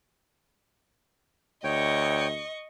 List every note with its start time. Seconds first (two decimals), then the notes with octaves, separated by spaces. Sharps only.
1.64 D2 C#5 D#5 G5 C#6